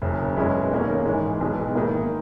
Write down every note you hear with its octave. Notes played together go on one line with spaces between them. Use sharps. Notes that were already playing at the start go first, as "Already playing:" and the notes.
F#1 F#2 C#3
B1 B2 G#3 C#4 E4
D#2 D#3 A#3 C#4
G#2 E3 G#3
B1 B2 G#3
G#2 D#3 A#3 E4